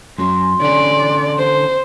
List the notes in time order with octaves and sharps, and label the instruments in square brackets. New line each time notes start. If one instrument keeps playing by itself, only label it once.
[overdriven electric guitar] F#2 F#3 [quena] C6
[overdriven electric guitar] D3 C#4 [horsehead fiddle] D5
[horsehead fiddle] C5